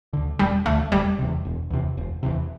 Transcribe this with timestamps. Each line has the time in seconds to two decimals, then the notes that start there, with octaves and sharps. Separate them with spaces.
0.13 D2 D3
0.39 E1 G3
0.66 D2 D3 A3
0.92 E1 G3
1.19 E2 C3
1.45 E1
1.70 E2 C3
1.97 E1
2.23 E2 C3